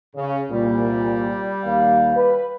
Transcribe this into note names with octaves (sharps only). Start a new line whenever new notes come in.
C#3
C2 A#2 G3
D#2 A#3 F5
B4